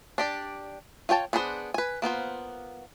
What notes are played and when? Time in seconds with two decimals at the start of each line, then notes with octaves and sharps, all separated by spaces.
0.18 D4 G4 D5
1.09 F4 C#5 G5 A5
1.33 B3 D4 G#4 A#4 C5
1.74 B4 G#5
2.02 A#3 B3 F4 C5